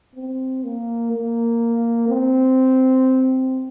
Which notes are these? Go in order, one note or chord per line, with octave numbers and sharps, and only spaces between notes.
C4
A#3
A#3
C4